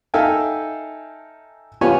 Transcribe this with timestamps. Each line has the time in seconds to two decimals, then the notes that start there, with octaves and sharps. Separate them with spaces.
0.14 D#4 A4 E5 F5 G5 G#5
1.81 B3 F4 G4 B4 C#5 G#5